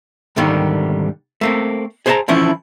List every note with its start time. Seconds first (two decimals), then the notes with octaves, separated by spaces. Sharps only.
0.36 C2 G#2 D3 D#3 G3 A#3
1.41 A3 A#3 C4
2.06 G#4 C5 C#5 E5 A5 A#5
2.28 D3 E3 F3 C#4 E4